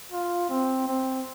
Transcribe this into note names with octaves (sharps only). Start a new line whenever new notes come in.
F4
C4
C4